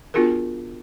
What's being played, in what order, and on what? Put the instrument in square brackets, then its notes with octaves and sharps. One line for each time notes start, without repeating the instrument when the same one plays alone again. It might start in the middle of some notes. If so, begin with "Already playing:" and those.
[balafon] B3 D4 F4 F#4 G#4 A#4